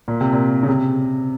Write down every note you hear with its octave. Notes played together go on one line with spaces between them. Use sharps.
A#2
C3
A#2
C#3
C3